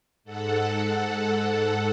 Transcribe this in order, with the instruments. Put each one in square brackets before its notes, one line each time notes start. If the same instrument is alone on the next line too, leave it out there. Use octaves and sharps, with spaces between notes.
[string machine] G#2 A4 F#5